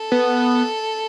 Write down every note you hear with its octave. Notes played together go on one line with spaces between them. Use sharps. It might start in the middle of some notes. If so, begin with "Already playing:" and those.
Already playing: A4
B3